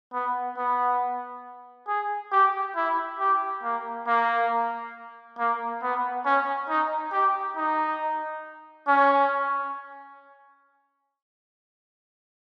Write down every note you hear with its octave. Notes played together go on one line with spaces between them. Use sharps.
B3
B3
G#4
G4
E4
G4
A#3
A#3
A#3
B3
C#4
D#4
G4
D#4
C#4